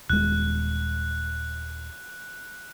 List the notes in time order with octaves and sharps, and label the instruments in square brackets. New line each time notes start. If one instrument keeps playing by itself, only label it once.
[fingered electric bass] D#1 G#3 [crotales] F#6